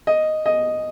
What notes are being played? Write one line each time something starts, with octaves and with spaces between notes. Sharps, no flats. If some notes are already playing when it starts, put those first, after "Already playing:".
D#5
D#5